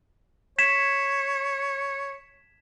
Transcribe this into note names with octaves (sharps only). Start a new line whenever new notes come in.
C#5 G#6 B6 E7